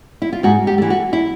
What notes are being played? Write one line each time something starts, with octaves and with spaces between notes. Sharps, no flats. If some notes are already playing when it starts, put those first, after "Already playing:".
E4
F4
G#2 F#4
G4
E3 A3
F#4
E4